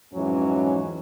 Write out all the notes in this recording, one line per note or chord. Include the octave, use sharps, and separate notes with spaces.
F2 G#2 E3 F#3 C#4